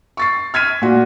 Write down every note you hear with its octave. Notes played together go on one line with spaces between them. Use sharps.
C#6 A6 C7
F6 G#6 B6 D#7
A#2 F4 F#4